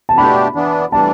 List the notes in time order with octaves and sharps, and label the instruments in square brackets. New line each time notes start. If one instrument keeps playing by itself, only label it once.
[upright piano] A5
[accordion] B2 A3 D4 G4 [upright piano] B5
[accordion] E3 B3 D4
[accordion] A2 E3 G3 D4 [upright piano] A5